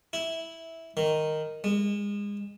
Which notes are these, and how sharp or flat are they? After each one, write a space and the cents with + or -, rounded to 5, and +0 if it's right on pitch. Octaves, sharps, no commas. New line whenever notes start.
E4 -10
D#3 -5
G#3 -30